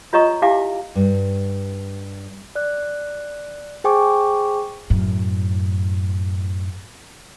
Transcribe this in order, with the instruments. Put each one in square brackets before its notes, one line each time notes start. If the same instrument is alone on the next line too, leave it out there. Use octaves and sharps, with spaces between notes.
[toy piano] F4 C#5 D#5 A#5 C#6 D#6
E4 G4 E5 F5 G#5 D6
[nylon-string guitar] G2
[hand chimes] D5 F#6
G#4 C5 G5 G#5 C#6 D6
[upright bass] F#2 A2